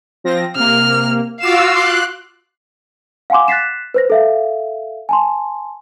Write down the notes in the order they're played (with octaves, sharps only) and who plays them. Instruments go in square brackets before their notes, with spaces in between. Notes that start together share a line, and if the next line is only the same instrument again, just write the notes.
[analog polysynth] F3 C4 A#6
[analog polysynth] C3 A#3 [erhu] F6
[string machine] F4 F#4 E6 [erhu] F5 [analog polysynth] D6 E7
[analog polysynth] C6 D6 [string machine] F#6
[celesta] F5 F#5 G#5 C6 D6
F#6 A6 B6 C7 E7
B4 C5 A#6
A4 E5 F5
G#5 A5 C6